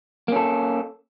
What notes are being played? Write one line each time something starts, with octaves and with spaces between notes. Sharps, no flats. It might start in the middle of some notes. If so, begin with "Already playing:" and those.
A#3 C#4 A4